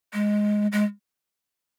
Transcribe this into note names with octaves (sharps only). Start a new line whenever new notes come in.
G#3
G#3